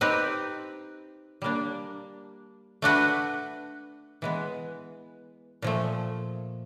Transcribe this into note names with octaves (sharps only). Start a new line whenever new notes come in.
C4 D#4 G4 B4
G3 A#3 D4
A3 D4 F#4 B4
E3 G#3 B3
A#2 F3 A3